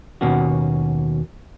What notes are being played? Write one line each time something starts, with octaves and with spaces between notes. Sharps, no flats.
D#2 B2 A#3 C#4 F#4